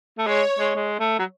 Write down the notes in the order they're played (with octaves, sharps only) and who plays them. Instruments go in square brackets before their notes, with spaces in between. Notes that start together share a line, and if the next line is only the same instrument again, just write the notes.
[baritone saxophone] A3
[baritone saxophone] G#3 [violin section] C#5
[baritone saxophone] G#3
G#3
A3
F#3